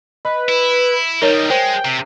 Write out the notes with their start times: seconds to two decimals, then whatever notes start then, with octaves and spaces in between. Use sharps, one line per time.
0.25 B4 D#5
0.49 E4
1.22 D#3 G3 D#4 A#4 C#5
1.50 G#3 C5 G5
1.85 C3